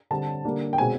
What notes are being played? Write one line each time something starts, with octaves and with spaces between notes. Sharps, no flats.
D3 G3 C4 A5
D3 G3 A#3 D4
G5
B2 G#3 C4 G#5